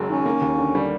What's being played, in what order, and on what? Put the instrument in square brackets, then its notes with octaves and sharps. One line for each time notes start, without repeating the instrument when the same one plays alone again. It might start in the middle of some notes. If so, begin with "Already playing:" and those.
Already playing: [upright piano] F#1 F#2 F#3 G#3
[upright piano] D#3 [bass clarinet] C#4
[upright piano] A#3
D#2
D3
G3